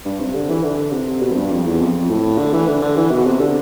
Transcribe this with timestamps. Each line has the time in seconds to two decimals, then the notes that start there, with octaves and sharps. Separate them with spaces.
0.05 G2
0.20 C3
0.35 D3
0.49 E3
0.63 D3
0.92 C3
1.22 B2
1.32 F2
1.37 G2
1.51 F2
1.66 E2
1.80 F2
2.10 A2
2.38 D3
2.53 E3
2.68 D3
2.82 D3
2.97 E3
3.11 B2
3.26 C3
3.40 D3